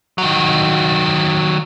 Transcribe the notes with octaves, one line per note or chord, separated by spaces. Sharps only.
D#3 F#3